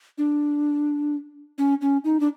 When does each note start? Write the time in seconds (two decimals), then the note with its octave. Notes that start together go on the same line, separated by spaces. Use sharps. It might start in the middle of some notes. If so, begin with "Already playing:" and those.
0.18 D4
1.58 C#4
1.81 C#4
2.04 D#4
2.20 D4